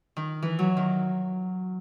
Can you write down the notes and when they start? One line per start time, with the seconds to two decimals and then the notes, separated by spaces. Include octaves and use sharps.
0.17 D#3
0.42 E3
0.59 F#3
0.77 D#3